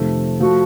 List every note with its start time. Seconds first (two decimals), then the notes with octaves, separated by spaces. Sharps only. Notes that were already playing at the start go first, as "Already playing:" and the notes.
Already playing: F2 C3 D#3 A3
0.40 F3 A3 F#4